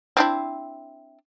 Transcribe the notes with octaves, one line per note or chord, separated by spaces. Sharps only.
C4 D4 E4